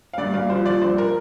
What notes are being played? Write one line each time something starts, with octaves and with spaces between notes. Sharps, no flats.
F5
G2 D5
G2 F5
F3 C5
F3 D5
G2 C5
A#4